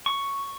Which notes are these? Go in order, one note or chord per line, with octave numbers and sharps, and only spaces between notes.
C#6